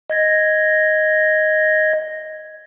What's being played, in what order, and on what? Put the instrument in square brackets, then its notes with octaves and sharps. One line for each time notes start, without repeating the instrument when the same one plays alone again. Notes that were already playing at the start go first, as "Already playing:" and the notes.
[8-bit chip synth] D#5 G#6 A#6